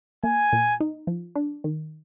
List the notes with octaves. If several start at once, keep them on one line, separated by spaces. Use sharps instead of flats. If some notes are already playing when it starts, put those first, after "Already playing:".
A#3 G#5
A#2
D#4
F3
D4
D#3